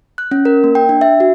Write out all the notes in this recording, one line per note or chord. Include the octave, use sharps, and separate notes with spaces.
F#6
C#4
A#4
A#3
G5
D4
E5
F#4